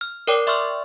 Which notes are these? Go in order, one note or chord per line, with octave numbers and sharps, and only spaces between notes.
F6
A#4 C#5 D5 G5 D6
D5 E5 C6 C#6 E6 F6